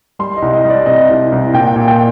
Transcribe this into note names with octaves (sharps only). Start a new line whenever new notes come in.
G3 C6
D#5
C2
D#5
G3
D5
C3 D#5
C2
C2
A#2 G5
A#2
G5